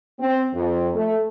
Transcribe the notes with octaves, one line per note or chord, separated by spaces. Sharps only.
C4
F2
A3